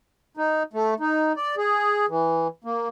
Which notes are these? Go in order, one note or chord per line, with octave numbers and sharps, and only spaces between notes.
D#4
A3
D#4
D5
G#4
E3
A#3